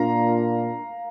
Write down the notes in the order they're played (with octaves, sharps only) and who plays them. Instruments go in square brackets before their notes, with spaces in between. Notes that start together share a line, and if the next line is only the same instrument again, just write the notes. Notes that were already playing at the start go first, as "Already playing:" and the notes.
Already playing: [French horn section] A#2 A#3 D4 F4 [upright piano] F5 A#5